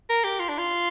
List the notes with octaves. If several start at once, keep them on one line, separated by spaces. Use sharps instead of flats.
A#4
G4
F4
D4
F4